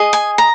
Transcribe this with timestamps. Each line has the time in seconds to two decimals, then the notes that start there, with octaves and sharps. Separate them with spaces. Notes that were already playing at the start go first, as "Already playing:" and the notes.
Already playing: G#4 D#5
0.13 G#5
0.38 A#5